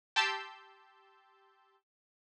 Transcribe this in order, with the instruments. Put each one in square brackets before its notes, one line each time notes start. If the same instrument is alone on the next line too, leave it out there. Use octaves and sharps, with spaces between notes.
[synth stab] G4 A5 C6 E6 G6